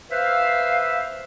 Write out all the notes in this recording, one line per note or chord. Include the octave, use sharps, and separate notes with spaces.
B4 C5 E5 F5